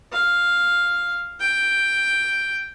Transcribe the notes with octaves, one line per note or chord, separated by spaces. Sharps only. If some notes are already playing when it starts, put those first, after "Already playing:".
F5
G5